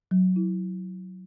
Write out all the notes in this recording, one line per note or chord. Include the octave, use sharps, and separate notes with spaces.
F#3
E4